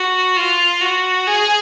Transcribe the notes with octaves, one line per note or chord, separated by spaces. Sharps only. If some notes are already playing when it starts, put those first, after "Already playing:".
Already playing: F#4
F4
F#4
G#4